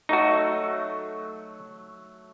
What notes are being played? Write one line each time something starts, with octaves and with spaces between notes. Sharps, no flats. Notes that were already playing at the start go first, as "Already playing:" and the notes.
F#3 A3 D#4 F#4